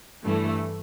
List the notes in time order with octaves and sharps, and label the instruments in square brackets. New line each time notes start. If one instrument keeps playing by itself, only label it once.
[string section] G2 E3 A3